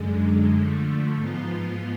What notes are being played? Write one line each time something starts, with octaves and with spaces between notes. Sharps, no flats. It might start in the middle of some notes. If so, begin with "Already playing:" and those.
Already playing: F#2 D3 G#3
D3 F3 A3
G#2 F3 B3 F4